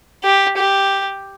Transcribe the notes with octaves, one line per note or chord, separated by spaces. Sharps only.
G4
G4